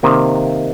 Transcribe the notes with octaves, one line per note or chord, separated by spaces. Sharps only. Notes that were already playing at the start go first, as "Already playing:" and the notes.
C3 D#3 A#3